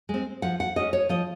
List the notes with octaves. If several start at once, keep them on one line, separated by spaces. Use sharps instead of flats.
G#3 C4
F3 F#5
F#5
G#3 C#4 D#5
C#5
F3 D#5